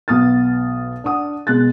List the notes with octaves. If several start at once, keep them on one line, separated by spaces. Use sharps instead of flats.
B1 B3 D#6 F6 A6
D4 F#5 D#6
B2 G#3 F#6 A6